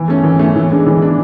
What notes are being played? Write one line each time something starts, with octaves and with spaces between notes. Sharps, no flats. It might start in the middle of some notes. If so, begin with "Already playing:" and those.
Already playing: E3
A3 C#4
E3
A3 C#4
E3
G#3 D4
E3
G#3 D4